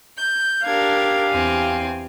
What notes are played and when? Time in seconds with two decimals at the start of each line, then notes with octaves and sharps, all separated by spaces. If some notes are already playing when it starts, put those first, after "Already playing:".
0.16 G6
0.64 D4 G4 A#4 F5 G#6
1.30 E2 C4 G#5